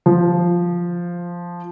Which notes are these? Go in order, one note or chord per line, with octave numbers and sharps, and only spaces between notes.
F3